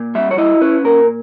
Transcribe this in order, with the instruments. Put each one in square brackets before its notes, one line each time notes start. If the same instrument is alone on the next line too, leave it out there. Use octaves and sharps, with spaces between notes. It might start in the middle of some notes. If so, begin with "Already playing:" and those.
Already playing: [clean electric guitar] A#2
G3 E5
C#5
E4 D#5
C#4 B4
A#2 A#4